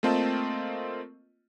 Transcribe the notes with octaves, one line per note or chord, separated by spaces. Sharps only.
A3 A#3 C4 F4 D#5 A5